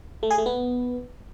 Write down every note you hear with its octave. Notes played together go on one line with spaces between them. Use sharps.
A3
G#4
A3
B3